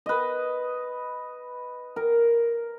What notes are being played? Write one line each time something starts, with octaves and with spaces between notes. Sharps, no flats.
B4 D#5
A#4